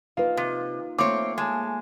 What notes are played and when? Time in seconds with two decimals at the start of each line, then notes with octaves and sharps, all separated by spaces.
0.17 A#3 D#4 F4 B4 F5
0.37 C3
0.99 A3 A#3 C4 C#5 D6
1.38 G#3 G#5 A5